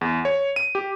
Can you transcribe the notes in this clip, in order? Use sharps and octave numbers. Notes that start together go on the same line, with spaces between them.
E2
C#5
D#7
G4